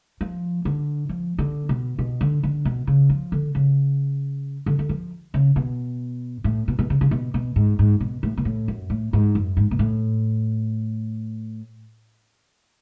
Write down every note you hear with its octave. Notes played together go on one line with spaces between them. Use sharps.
F3
D3
F3
D3
B2
B2
D3
D3
B2
C#3
F3
D3
C#3
D3
D3
F3
C#3
B2
A2
B2
B2
C#3
C#3
B2
B2
G#2
G#2
B2
A2
B2
A2
F#2
A2
G#2
F#2
G#2
B2
A2